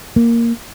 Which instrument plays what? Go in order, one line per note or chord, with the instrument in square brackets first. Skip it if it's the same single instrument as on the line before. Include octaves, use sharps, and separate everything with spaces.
[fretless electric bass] A#3